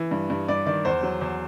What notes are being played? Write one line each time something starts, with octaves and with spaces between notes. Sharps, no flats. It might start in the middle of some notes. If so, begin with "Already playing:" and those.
Already playing: E3
G2
G2
G2 D5
D#3 D5
E2 C5
F#3
E2